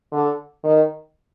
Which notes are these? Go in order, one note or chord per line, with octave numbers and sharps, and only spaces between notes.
D3
D#3